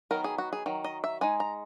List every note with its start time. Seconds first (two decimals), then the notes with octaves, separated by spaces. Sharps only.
0.11 D#3 F#3 B3 D#4 A#4
0.24 G#4
0.38 F#4
0.53 G#4
0.66 D#3 F#3
0.84 D#5
1.04 E5
1.21 G#3 D#4 G#5
1.40 A#5